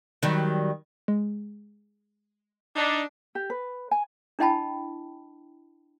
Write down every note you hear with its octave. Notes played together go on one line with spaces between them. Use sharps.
D#3 F#3 G3
G#3
D4 D#4
G4
B4
G#5
D4 E4 D#5 G5 A5 B5